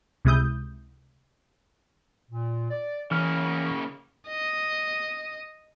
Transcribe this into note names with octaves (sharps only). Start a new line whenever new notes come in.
C#2 C3 G#3 E4 D#6 G6
A#2
D5
C#3 E3 A#3 C#4 F6
D#5